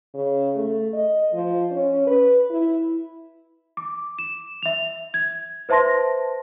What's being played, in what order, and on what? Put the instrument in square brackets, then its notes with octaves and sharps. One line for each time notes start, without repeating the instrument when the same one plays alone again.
[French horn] C#3
A3
D#5
F3
C#4
B4
E4
[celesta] D6
E7
E5 F7
G#6
B4 C5 E5 A5 C6 A#6